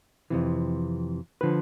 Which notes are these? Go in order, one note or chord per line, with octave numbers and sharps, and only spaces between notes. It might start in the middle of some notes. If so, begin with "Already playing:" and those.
F2 C3 E3
D3 F3 B4